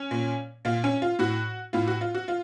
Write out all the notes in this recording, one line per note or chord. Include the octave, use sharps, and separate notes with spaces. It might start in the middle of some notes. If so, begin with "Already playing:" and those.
Already playing: C#4
A#2
A#2 F4
C#4
F4
A2 F#4
A2 F4
F#4
F4
F#4
F4